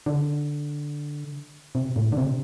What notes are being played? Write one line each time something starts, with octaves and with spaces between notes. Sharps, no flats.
D3
C3
A2
D3
C3